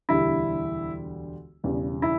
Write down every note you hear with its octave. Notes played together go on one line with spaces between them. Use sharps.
E1 D2 D3 G3 E4
E1 E2 C#3 G3
E4